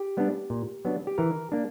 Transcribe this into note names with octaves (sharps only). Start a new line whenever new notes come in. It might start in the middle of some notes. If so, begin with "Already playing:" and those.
Already playing: G4
G3 B3 D4
A#2
F#3 B3 D4
G4
E3 A#4
A#3 D4